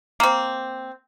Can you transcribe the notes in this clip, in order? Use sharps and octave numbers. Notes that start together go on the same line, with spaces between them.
A#3 C4